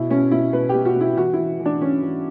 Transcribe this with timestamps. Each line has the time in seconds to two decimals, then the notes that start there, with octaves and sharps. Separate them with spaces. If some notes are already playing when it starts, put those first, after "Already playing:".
Already playing: B2 E4
0.10 B2 C#4
0.31 B2 E4
0.53 B2 B4
0.69 G4
0.74 B2
0.85 F#4
0.96 B2 E4
1.17 E3 F#4
1.33 E4
1.39 E3
1.60 E3
1.66 D4
1.81 E3 C#4
2.02 E3